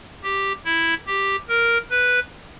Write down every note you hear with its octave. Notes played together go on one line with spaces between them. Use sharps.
G4
E4
G4
A#4
B4